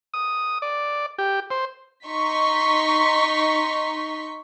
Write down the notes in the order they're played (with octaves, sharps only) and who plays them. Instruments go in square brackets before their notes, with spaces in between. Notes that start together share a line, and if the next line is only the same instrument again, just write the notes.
[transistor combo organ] D#6
D5
G4
C5
[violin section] D#4 C6 C#6 B6